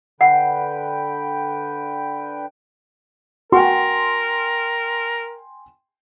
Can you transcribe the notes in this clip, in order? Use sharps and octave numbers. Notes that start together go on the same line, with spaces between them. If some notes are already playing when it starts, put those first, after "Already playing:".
D3 B4 F#5 G5
F#4 A#4 G5 G#5 C6